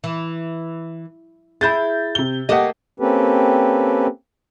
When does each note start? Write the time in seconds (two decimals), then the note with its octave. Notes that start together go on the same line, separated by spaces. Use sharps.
0.04 E3
1.61 E4 G#4 B5 G6 A6
2.15 C3 G7
2.49 A3 A#3 G4 D#5 F#5
3.00 A#3 C4 C#4 G4 A4 B4